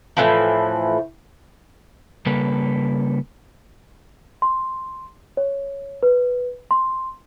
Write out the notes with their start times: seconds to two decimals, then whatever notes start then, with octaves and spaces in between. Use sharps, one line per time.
0.17 A2 E3 F3
2.26 C#3 G3 A#3 A4 B4
4.42 C6
5.37 C#5
6.03 B4
6.71 C6